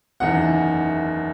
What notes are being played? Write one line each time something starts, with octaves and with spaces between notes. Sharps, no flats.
F#1 E2 D#3 F#5